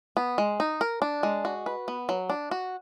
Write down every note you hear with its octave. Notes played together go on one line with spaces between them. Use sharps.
B3
G#3
D#4
A#4
D4
G#3
F#4
B4
B3
F#3
D4
F#4